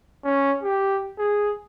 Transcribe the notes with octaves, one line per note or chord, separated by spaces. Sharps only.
C#4
G4
G#4